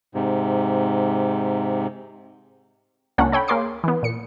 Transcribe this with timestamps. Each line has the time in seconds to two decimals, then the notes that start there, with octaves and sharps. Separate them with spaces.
0.14 G#2 C3
3.18 C#2 A#3 C#4 D4 F#5
3.32 A4 C#5 G5 B5
3.48 A#3 G#4 C#5 C6 D6 C7
3.84 E3 B3
4.03 A#2 C#7